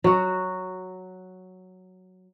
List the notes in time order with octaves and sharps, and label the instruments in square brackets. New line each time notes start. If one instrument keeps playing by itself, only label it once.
[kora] F#3 F#4